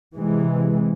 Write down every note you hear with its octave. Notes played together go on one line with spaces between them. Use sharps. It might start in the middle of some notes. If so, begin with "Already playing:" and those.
C3 E3 G#3